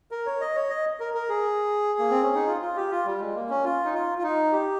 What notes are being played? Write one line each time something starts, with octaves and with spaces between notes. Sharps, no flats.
A#4
C#5
D#5
C#5
D#5
A#4
A#4
G#4
A#3
C4
C#4
D#4
F4
F4
G4
F4
G3
G#3
A#3
C#4
F4
D#4
F4
F4
D#4
G4